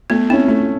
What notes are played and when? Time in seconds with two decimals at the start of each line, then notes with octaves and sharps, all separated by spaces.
0.10 A3 B3
0.30 C4 C#4 E4
0.48 A3